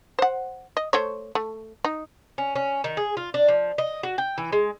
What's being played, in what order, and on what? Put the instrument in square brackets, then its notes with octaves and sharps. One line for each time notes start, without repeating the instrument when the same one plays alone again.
[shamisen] C5 F#5
D#5
A3 C5 C#5
A3
D#4
[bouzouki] C#4
C#4
D#3
G#4
F4
D4
F3
D#5
F#4
G5
E3
G#3